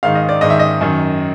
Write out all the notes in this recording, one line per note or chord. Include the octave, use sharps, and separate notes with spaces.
G#2 D#3 F5
D#5
D5
G#2 D#3 D#5
E5
D#5
F#2 D#3